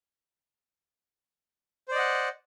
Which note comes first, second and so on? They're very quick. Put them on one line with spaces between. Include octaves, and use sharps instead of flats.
C5 D5 D#5 F#5